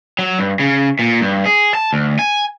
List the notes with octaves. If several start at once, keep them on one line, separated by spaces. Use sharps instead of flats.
F#3
G2
C#3
A#2
G2
G#4
A5
D2
G#5